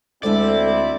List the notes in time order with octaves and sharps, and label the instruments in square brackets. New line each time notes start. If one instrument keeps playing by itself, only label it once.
[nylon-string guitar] D2 G#3 D4 [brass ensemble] C4 E4 [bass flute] A4 [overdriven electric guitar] D5